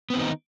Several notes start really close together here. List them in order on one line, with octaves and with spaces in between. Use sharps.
B3 C4 D#3 D#4